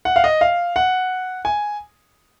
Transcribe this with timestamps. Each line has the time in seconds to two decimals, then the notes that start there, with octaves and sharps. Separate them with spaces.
0.05 F#5
0.16 F5
0.24 D#5
0.41 F5
0.76 F#5
1.45 G#5